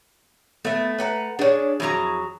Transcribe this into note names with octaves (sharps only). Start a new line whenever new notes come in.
A3 B3 E5
B4 F#5 A#5
C#4 D4 G#4
F2 F#3 E4 G#4 A#5